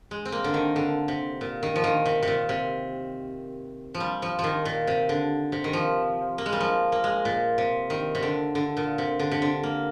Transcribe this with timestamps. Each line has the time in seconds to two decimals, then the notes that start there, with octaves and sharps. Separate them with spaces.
0.11 G#3
0.25 C4
0.32 A#3
0.44 D3
0.54 D#3
0.76 D3
1.08 C3
1.41 A#2
1.63 D#3
1.76 F3
1.84 D#3
2.06 C3
2.23 C3
2.28 A#2
2.49 C3
3.94 F3
4.00 G3
4.22 F3
4.39 F3
4.44 D#3
4.65 A#2
4.87 C3
5.09 D3
5.52 C3
5.64 D#3
5.73 F3
6.38 A#3
6.46 G#3
6.52 G3
6.60 F3
6.92 A#3
7.04 G#3
7.25 A#2
7.58 C3
7.90 D#3
8.15 C3
8.23 D3
8.55 D3
8.77 A#2
8.98 C3
9.19 D3
9.32 C3
9.42 D3
9.63 A#3